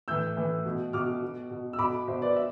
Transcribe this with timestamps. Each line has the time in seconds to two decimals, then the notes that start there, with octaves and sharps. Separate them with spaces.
0.08 A2 E3 E6 G6
0.37 A2 E3
0.65 B2
0.93 B2 D6 F6
1.22 B2
1.51 B2
1.73 E6
1.79 B2 B5 D6
2.07 B2 C5 E5
2.22 B4 D5
2.36 E5